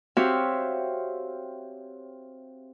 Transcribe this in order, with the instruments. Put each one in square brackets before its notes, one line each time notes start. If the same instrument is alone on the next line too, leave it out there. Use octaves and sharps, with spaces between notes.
[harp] C4 F#4 G4 C#5 E5 F5